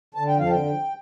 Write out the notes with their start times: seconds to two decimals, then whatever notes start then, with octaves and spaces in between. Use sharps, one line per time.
0.14 D3 A5
0.27 G5
0.31 F2
0.39 F5
0.46 D3 G5 A5
0.63 F2